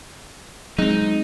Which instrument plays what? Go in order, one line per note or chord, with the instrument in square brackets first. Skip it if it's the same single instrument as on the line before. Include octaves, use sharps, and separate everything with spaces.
[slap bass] F#3 C4 [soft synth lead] G#3 [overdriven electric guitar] D#4